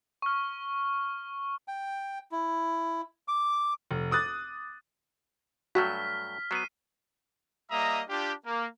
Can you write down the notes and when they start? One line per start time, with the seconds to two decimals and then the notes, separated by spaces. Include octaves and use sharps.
0.22 C#6 F6
1.68 G5
2.31 E4
3.28 D6
3.91 F1
4.11 D6 D#6 F#6 A6
5.75 G2 F#3 A3 F#4 F6 B6
6.51 F#3 B3 C7 D#7
7.71 G3 A#3 D#5 E5 A#5 D#6
8.09 D4 F4 G4
8.46 A#3